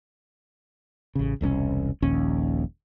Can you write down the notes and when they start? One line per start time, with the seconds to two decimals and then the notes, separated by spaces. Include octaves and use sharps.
1.15 A1 C#3
1.41 E1 C2 C3 C#4
2.02 D#1 A#1 D#2 C#4